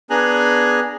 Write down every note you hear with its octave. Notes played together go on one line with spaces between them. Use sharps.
B3 D4 G#4 G#5 A#5 F#6